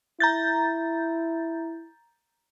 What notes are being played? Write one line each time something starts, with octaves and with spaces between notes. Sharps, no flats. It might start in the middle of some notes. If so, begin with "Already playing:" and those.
E4 A#5 G6 A6